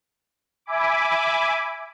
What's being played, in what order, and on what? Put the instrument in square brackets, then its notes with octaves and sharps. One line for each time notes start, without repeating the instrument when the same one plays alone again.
[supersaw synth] E5 G#5 B5 D6